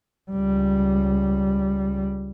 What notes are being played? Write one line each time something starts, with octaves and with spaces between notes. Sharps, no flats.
C#2 G3